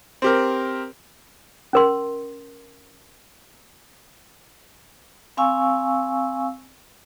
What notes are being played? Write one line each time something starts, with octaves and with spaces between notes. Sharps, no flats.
C4 G4 A#4
C#4 A#4 C6
C4 F5 G#5 C#6 E6